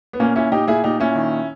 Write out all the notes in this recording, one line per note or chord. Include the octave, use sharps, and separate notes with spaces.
B3
A#2 A#3 C#4
A#2 C#4 E4
A#2 D#4 G4
A#2 E4 G#4
A#2 D#4 G4
A#2 C#4 E4
D#3